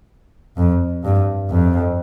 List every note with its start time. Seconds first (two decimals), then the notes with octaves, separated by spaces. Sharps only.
0.57 F2
1.04 G2
1.50 F2